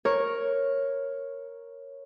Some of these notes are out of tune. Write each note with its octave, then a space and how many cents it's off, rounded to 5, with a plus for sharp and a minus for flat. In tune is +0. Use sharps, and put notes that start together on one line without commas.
A#4 +0 C#5 -10